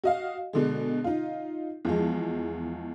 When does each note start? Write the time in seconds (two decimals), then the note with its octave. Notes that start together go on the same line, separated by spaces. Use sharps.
0.04 F#4 D#5 F5
0.53 B2 D3 G#3
1.04 D#4 F4
1.85 E2 F3 G#3